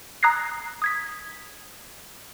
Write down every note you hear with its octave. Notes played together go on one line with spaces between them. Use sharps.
A#5 D#6 F#6 G#6 A#6 C7
D#6 G#6 B6